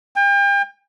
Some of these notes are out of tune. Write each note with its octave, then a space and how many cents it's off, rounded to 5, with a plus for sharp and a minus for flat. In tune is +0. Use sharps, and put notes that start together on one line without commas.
G5 +40